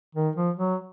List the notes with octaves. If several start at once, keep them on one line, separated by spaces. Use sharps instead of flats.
D#3
F3
F#3